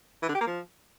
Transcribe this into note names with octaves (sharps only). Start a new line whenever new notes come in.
E3
D3
G4
A#3
F3